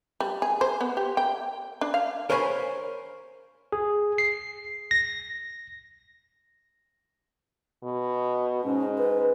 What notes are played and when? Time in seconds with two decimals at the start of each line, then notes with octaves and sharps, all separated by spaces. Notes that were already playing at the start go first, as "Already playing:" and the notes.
0.20 G3
0.42 G#4
0.61 C5
0.81 B3
0.97 G4
1.17 G5
1.81 D4
1.94 F5
2.30 A#4 C5 C#5 G#5 A5 B5
3.72 G#4
4.18 C7
4.91 A#6
7.84 B2
8.64 G#2 C#4
8.98 B4